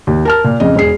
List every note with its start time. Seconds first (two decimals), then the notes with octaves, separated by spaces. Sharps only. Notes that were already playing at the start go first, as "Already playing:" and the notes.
0.07 D#2
0.25 A#4 A5 F6
0.44 A#2
0.60 F2 C#3 D#5
0.76 E1 G#4 C7